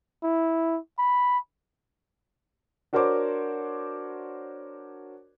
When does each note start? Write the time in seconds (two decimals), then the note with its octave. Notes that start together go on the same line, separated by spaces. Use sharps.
0.23 E4
0.99 B5
2.93 D4 F#4 A#4 C5 C#5 D6